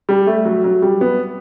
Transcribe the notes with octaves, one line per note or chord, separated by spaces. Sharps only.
G3
A3
F#3
F#3
G3
B3